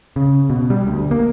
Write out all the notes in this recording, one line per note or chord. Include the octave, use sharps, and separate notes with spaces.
C#3
B2
G3
D2
A#3